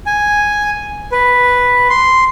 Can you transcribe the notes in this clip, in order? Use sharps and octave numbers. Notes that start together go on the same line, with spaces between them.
G#5
B4
C6